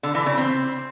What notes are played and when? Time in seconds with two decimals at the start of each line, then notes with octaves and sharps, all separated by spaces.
0.03 D3
0.15 E3
0.26 C#3
0.37 C4